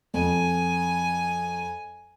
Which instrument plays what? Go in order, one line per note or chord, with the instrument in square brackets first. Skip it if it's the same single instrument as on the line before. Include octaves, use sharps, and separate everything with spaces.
[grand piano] F2 [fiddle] G#5